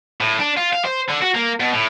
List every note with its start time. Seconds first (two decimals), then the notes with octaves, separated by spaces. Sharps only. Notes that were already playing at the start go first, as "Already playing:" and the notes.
0.21 A2
0.39 D4
0.57 F4
0.73 F5
0.85 C5
1.09 D3
1.21 F#4
1.34 A#3
1.60 B2
1.73 A2